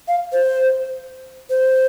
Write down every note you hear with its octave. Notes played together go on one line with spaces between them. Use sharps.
F5
C5
C5